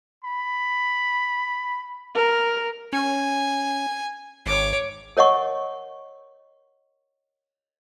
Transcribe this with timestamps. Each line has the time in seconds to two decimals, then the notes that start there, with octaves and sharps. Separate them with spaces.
0.25 B5
2.15 A#4
2.93 C#4 G#5
4.46 G#1 C#5 D6
5.17 A#4 C#5 D#5 F#5 C#6